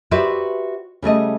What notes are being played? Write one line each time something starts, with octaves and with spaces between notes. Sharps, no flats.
F#4 G4 B4 C5 D5 E5
C#3 G3 A3 D#5